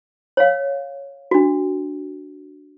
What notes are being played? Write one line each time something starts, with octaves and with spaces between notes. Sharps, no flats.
C#5 F5
D4 F#4